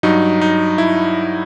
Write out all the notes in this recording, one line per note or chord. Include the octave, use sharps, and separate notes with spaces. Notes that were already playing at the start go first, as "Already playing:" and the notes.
G2 F#3 D#4
D#4
E4